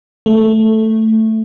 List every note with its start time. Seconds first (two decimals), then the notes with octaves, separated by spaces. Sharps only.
0.26 A3